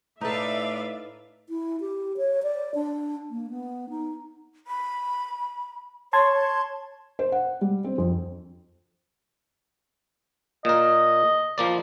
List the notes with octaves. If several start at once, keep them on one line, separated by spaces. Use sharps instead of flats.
A2 D#4 A4 B4 D5 E5 F5
E4
G4
C#5
D5
D4
A#3
B3
D#4
B5
C#5 A5 C6 G#6
C5
F#5
G3
C4
F2
A#2 A#4 D#5
F3 A#3 D5